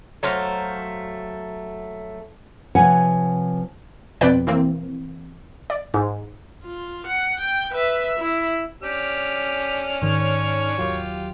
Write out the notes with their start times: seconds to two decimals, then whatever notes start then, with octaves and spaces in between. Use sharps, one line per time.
0.23 F#3 A3 C5 F5
2.75 C3 F3 B4 C#5 F#5 G#5
4.21 F2 B2 C4 B4 D5 G5
4.47 E3 A#3 C4
5.70 D5
5.94 G#2
6.64 F4
7.07 F#5
7.40 G5
7.71 B4 E5
8.19 E4
8.83 C#4 D4 G4 F6
10.02 G#2 D#3 C#5
10.78 D#2 F#3 F4 G4